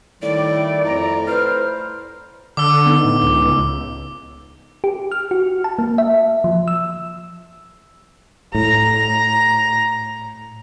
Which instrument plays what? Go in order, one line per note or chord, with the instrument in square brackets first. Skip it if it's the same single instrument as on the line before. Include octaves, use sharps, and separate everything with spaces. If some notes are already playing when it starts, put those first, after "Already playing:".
[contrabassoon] A2 [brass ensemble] D#3 G3 A3 [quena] D5
[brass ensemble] F2 A#5 [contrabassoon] A2
[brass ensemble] B4 C5 [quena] F6
[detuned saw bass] D3 [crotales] D6 E6
[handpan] B3 D#4
[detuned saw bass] A2
C#2
[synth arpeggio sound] G4
F6
F#4
A5
A#3
E5
F3
E6
[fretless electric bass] A2 [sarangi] A#5